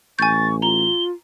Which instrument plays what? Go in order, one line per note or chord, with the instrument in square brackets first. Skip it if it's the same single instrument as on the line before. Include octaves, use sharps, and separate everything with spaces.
[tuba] A1 [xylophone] G#5 G6 [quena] C#6 [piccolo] A6
[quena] F4 [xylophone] A#5 [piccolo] G7